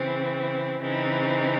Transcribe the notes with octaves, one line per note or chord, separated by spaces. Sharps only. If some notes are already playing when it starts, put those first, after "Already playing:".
Already playing: C#3 E3 C4
C#3 E3 C4 D#4